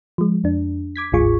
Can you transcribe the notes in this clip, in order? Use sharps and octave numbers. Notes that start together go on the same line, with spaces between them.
F3 G#3
F2 D4
D6 G#6 B6
G1 D2 G#2 F4 G#4 C#6